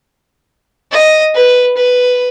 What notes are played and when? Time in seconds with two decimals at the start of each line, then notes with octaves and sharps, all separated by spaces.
0.92 D#5
1.35 B4
1.77 B4